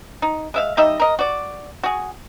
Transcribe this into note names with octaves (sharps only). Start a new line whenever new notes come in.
D#4
G#3 E5 F5
G3 D#4 D#5 E5
A#4 D#5
F#4 D5
F#4 G#4